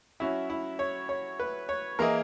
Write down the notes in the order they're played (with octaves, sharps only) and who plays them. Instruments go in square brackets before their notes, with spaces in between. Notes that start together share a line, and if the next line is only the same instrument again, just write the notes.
[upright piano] F#3 C#4 F#4 [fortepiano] E4
[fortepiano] E4
C#5
C#5
B4
C#5
[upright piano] E3 A#3 E4 G#4 D#5 [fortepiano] A#4